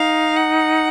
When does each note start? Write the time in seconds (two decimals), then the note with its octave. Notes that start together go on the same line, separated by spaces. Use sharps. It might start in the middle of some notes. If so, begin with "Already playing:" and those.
Already playing: D#4 F5
0.36 F#5